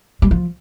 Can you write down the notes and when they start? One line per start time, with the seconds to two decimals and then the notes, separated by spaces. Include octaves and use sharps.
0.22 G3
0.31 F3